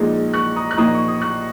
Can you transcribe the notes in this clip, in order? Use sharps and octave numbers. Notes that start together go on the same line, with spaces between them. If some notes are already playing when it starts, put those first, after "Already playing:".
Already playing: A#1 A#2 G#3 D#4
C#6 F#6
A#5 D#6
F#6
A#1 A#2 A#3 D#4 A#5 D#6
C#6
D#6
C#6 F#6